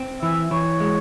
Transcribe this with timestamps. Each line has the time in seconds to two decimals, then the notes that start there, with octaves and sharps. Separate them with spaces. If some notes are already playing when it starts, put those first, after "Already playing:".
Already playing: C4
0.23 E3 E5
0.51 E3 C#5
0.80 G#3